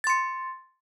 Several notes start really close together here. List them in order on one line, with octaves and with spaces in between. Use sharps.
A6 C6 C#7